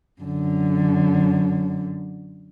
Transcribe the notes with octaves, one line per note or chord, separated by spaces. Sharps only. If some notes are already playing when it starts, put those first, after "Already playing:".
F#2 D3